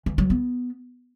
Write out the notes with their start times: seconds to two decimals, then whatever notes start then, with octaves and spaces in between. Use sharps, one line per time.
0.06 E3
0.18 F#3
0.30 B3